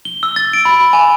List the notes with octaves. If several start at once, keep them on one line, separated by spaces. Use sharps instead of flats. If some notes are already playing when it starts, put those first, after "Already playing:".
G7
E6
A6
D7
B5
G#5